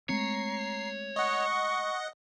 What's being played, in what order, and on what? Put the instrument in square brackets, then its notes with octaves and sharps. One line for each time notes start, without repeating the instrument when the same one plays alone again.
[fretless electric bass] G#3 A3 C4 [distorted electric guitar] C#5 [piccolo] A#5 [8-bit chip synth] C7
[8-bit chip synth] D#5 F#5 [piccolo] C#6